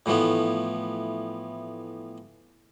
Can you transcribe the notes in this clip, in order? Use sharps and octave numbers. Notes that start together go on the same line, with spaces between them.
A2 E3 F3 A3 B3